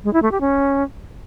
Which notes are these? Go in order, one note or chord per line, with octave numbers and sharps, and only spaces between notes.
G#3
E4
A3
G4
C#4